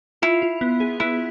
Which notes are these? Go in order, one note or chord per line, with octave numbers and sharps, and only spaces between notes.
E4 F4
F4
B3
G#4
B3 E4